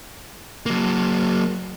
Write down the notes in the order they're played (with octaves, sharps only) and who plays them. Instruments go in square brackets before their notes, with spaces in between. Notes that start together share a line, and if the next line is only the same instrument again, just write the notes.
[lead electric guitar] F#3 A#3